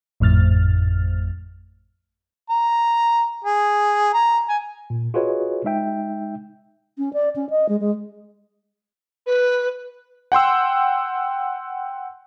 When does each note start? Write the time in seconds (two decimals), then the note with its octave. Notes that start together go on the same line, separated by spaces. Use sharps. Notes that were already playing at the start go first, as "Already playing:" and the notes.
0.20 G#1 F2 A2 F6 A6
2.49 A#5
3.44 G#4
4.14 A#5
4.49 G#5
4.90 A#2
5.14 F4 F#4 G#4 B4 C#5 D#5
5.64 G#3 D#4 E5 G5
6.98 C#4
7.13 D5
7.36 C#4
7.50 D#5
7.69 G#3
7.80 G#3
9.26 B4
10.32 F#5 G5 C6 E6